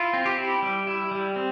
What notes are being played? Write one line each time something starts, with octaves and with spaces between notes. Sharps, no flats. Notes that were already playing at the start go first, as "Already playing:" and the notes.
Already playing: E4 F4
C4
G4
E4
G3
E4
G3
C4